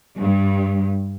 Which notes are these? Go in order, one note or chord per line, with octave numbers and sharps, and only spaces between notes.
G2